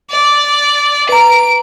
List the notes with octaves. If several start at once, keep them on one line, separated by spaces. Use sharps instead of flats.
D5
B4 A#5 D7